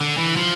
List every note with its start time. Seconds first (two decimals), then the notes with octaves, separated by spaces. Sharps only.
0.01 D3
0.18 E3
0.37 F3